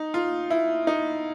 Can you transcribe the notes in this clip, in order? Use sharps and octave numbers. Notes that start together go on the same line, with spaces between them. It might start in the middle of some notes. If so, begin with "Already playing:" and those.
Already playing: D#4
F4
E4
D#4